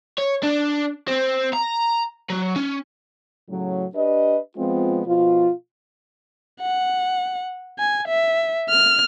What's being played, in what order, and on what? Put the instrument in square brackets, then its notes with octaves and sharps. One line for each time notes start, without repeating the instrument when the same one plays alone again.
[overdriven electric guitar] C#5
D4
C4
A#5
F#3
C#4
[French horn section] A2 C#3 F#3
D4 G4 B4 D#5
F3 G#3 B3 C4 F4
B2 F3 F4
[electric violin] F#5
G#5
E5
F6